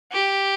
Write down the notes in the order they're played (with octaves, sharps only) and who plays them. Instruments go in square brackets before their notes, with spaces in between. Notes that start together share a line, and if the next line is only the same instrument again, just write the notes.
[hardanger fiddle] G4